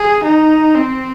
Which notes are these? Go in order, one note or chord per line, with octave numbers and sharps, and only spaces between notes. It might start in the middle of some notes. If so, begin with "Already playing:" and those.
Already playing: G#4
D#4
C4